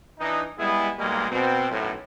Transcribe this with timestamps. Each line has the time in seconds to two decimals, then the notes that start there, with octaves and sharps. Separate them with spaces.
0.19 E3 D4 D#4
0.58 G3 G#3 B3 E4 G#4
0.98 B1 G3 G#3 A#3
1.31 B2 C4
1.71 B1 F#2 A2